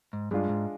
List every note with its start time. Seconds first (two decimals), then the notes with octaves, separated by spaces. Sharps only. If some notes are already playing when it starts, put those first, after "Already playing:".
0.13 G#2
0.31 G2 G#3 D4 F4
0.49 G#2